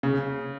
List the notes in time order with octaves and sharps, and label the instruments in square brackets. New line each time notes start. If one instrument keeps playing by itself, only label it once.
[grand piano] C#3